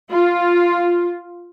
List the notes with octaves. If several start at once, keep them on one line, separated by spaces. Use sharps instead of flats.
F4